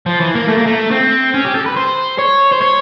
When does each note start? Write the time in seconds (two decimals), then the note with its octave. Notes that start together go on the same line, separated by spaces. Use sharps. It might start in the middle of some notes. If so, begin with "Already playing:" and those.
0.06 F3
0.21 E3
0.35 A#3
0.48 A3
0.58 A#3
0.66 A3
0.91 C4
1.34 C#4
1.44 G4
1.55 A4
1.66 B4
1.76 C5
2.18 C#5
2.52 C5
2.62 C#5